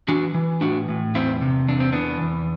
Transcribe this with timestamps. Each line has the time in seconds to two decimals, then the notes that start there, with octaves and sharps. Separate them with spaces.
0.08 E3 D4 F#4
0.34 E3
0.61 A2 D4 F#4
0.89 A2
1.15 E2 C4 E4
1.41 C3
1.68 E2 D4
1.80 C4
1.92 E3 B3 D4
2.22 E2